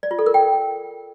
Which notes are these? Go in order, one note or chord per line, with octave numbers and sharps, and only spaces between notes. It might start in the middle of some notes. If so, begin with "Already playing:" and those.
D5
F4
A4
A#4
G5